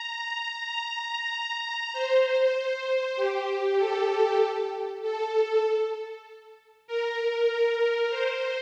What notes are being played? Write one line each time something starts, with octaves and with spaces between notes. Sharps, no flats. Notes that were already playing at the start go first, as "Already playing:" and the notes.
Already playing: A#5
A#5
C5
G4
A4
A4
A#4
C5